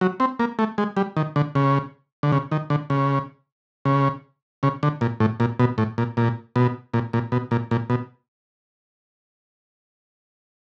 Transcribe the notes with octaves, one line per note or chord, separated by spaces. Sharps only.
F#3
C4
A#3
A3
G#3
G3
D#3
D3
C#3
D3
C#3
D#3
D3
C#3
C#3
C#3
D3
A#2
A2
A#2
B2
A2
A#2
A#2
B2
A#2
A#2
B2
A#2
A#2
B2